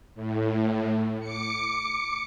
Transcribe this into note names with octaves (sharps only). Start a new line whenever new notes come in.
A2
D6 C#7